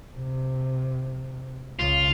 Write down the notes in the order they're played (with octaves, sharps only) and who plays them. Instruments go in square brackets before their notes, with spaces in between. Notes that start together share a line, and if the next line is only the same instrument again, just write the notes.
[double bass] C3
[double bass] C#2 C#3 [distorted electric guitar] F4